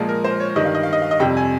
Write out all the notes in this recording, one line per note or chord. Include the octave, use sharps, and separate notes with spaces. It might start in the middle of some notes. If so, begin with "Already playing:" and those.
Already playing: A#2 F3 G#3
A#4
C5
C#5
G2 D#3 G3 D#5
F5
D#5
F5
D#5
F5
D#5
F2 C3 G3 G5
G#5